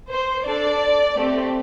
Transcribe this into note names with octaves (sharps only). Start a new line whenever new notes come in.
C5
D4 A4 D5
A3 C4 G4